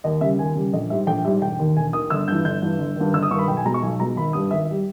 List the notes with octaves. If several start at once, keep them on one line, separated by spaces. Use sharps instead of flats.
D#2 D#5
C#3 G3 E5
D#2 G#5
C#3 G3
A#1 D#5
G#2 G3 E5
A#1 G5
G#2 G3 E5
E1 G5
D#2 D#3
E1 G#5
D#2 D#3 D#6
G1 E6
G2 E3 G6
G1 G6
G2 E3
G1
G2 D#3
G1 E6
D#6
G2 D#3 C#6
B5
B1 G5
G#5
B2 G#3 A#5
C#6
B1 G#5
B2 G#3 A#5
G#1 B5
G2 G3 D#6
G#1 E5
G3